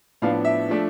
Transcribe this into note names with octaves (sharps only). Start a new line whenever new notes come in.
A2 F3 B3 D4 F5
E5
F3 A3 D4